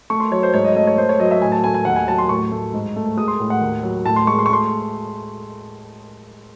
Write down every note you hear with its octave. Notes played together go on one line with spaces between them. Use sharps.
A3 C#6
C6
F#3 C#5
C5
G#2 C#5
D#5
A3 D#5
C#5
A3 C5
C#5
F#3 D#5
E5
A2 G#5
A5
A3 G#5
G#5
D#2 F#5
G#5
F#3 A5
C6
A2 C#6
A3
G#2
A3
G#3 D#6
C6
A2
F#5
D#2
F#3
A2 A5
C6
G#3 C#6
C6
C#6
A3 C6